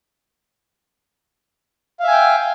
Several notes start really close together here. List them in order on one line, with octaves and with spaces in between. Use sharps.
F5 E5 G#5 G5